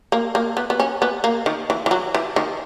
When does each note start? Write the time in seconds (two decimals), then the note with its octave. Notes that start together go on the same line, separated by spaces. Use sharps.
0.12 A#3
0.35 A#3
0.57 B3
0.70 B3
0.80 C#4
1.02 B3
1.24 A#3
1.46 D#3
1.70 E3
1.86 E3
1.91 F#3
2.15 E3
2.36 D#3